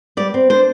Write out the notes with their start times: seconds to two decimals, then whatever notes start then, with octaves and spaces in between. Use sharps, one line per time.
0.17 G3 D5
0.34 C4
0.50 D4 C5